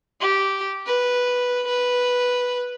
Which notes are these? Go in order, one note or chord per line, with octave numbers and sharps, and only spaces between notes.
G4
B4
B4